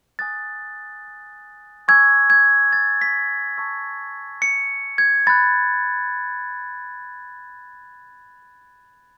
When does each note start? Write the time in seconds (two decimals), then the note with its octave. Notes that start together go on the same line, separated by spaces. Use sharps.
0.19 G#5 D#6 F#6 A6
1.88 G#5 C#6 E6 G#6
2.30 G#6
2.73 A6
3.02 B6
3.57 A5 C#6 E6
4.42 C#7
4.98 G#6
5.27 B5 F#6 A6